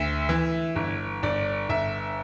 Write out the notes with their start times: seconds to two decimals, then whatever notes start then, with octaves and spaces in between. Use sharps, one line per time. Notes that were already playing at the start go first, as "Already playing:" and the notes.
Already playing: D2 E5
0.29 E3
0.76 G1
1.23 G1 D5
1.69 G1 E5